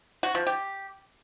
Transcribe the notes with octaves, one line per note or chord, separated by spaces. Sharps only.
F#4
F3
G4